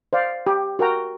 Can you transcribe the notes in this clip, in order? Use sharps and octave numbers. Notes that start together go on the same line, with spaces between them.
C5 D5 F5
G4
F#4 A#4 G5 A#5